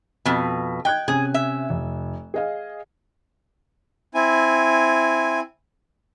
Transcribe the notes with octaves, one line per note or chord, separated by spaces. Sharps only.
F2 B2
D#5 G5 F#6 G#6
C3 C#4 G#4 G#5
E5
F1
G#4 D#5 F5
C4 E4 G#5